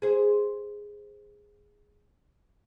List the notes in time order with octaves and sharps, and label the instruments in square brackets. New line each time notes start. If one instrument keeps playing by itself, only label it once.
[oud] G#4 C5